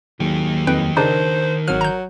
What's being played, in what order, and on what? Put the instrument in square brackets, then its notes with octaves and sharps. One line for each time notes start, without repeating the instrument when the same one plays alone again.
[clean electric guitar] D#2 F#3 G#4 [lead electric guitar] D#3 G4
[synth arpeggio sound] F2 B4 G5 [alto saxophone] D#4
[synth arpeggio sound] C#3 D4 D#4 [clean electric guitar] A#4 A5 [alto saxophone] C5
[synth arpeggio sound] G#1 F6 [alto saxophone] F#3
[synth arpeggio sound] A#5 G6